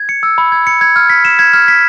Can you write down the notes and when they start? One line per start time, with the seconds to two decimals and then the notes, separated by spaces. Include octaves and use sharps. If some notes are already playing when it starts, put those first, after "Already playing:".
Already playing: G#6
0.09 C#7
0.23 E6
0.38 B5
0.52 G#6
0.67 C#7
0.81 G#6
0.96 F6
1.10 B6
1.25 E7
1.39 G#6
1.53 F6
1.68 B6